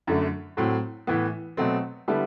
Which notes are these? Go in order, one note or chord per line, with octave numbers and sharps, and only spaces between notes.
F#2 D3 A3
A2 F#3 C4
A2 E3 B3
B2 F#3 A3 C4
D3 G3 B3 E4 A4